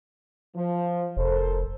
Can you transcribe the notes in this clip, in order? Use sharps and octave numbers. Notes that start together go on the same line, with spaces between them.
F3
F1 A4 A#4 C5